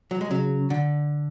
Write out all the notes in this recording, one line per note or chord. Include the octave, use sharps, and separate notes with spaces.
F#3
G#3
C#3 F#3
D3